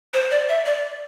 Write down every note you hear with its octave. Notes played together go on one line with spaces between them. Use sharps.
C5
D5
E5
D5